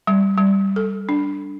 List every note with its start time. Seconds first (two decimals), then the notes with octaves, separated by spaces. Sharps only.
0.07 G3
0.37 G3
0.76 A4
1.09 D4